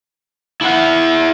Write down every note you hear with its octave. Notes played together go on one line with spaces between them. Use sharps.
E4 F#5